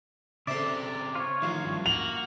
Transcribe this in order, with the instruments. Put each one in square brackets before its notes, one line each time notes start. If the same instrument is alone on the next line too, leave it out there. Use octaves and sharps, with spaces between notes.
[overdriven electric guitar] C#3 C4 [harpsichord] A4 C5 E5 [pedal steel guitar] D5
[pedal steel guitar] F4 C#5
[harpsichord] A1 F3 [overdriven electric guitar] D#3
[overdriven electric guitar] G2
[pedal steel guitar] A#3 [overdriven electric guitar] F#4 [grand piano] F7 F#7